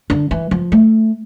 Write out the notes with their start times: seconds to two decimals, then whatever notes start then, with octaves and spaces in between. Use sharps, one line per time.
0.10 D3
0.31 E3
0.51 F3
0.72 A3